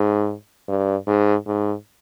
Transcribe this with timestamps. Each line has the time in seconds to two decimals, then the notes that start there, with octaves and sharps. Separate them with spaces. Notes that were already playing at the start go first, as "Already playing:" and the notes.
Already playing: G#2
0.69 G2
1.07 G#2
1.47 G#2